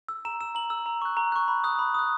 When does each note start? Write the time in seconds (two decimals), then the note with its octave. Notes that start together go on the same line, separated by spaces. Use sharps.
0.09 E6
0.25 A#5 E7
0.41 E6 E7
0.55 A#5 F#7
0.70 E6
0.86 A#5
1.02 C#6 F#6
1.17 A#5
1.32 C#6 F#6
1.48 B5
1.64 D#6 F#6
1.79 B5
1.94 D#6 F#6